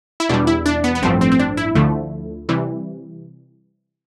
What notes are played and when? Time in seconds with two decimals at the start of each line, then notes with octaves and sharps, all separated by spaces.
0.20 E4
0.29 E2 B2 G3 D4
0.47 E4
0.66 D4
0.84 B3
0.95 B3
1.02 A1 G2 F3 A3 C4
1.21 C4
1.32 C4
1.39 D4
1.57 E4
1.75 D2 D3 F3 A3
2.49 C3 E3 G3